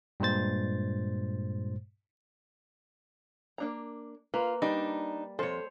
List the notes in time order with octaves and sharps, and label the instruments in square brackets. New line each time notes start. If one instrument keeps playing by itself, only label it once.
[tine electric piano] G2 A#2 G#3 C5 A6
[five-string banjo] A#3 D4 A#5
[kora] A#3 [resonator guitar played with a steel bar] F4 [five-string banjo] B4
[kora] G3 [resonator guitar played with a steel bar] D4 D#4
[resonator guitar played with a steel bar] F2 [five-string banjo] A4 [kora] C5 C#5